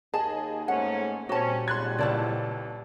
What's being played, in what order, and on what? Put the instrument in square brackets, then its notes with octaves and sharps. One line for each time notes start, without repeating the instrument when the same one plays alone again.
[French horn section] D#2 [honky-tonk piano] G#4 D#5 [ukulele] A5
[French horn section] G#2 A3 C#4 [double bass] A#3 [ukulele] F#5
[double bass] A#2 G3 [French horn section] C4 C#4 [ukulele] F#4 A5
[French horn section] F2 G#2 F#3 [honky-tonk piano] C6 F#6 G#6
[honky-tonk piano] C#2 A5 [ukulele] E4 C#5 D5